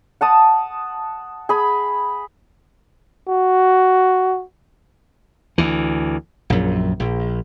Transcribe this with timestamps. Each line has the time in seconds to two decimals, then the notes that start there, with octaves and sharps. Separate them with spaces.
0.21 F#5 A5 D#6
1.49 G#4 B5
3.28 F#4
5.58 D2 E3
6.50 A#1 F#2
7.00 A#1